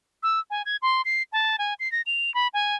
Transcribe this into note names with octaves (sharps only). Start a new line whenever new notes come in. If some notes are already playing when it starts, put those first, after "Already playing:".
E6
G#5
G#6
C6
C7
A5
G#5
C7
A#6
F7
B5
G#5